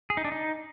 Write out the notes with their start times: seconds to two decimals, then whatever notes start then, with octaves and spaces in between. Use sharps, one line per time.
0.10 G#4
0.17 D#4
0.25 D4
0.32 D#4